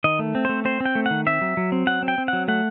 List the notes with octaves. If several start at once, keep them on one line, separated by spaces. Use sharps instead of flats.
D#3 D#5
A3
C4
A3 C5
C4 C5
C4
G5
A3
D#3 F#5
C4 E5
F#3
F#3
C4
F#3 F#5
C4
G5
C4
F#3 F#5
A3 F#5